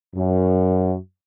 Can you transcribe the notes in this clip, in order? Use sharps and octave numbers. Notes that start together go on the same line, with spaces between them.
F#2